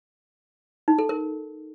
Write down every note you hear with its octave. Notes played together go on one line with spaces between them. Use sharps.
D#4
A4
A#4